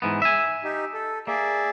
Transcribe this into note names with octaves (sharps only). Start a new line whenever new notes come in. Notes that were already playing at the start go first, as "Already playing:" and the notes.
G#2 E3 B3
E5 G#5
D#4 G4
A4
A#3 G#4 D5 E5